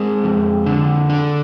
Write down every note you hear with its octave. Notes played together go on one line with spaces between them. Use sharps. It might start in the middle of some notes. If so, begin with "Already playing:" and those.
Already playing: G#3 C4
F2
D3
D4